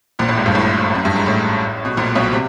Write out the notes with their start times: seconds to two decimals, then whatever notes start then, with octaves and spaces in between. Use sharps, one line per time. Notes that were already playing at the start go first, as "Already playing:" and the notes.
0.19 A#1 A#2
0.28 A1 A2
0.37 G#1 G#2
0.46 G1 G2
0.55 A1 A2
0.95 F#2
1.05 G2
1.16 G#2
1.26 A1 A2
1.85 B2
1.97 A#1 A#2
2.15 B1 B2
2.32 C3